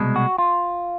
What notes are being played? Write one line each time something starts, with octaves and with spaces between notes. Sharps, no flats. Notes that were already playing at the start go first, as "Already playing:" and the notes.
Already playing: C2 B2 G#3
F#4
F4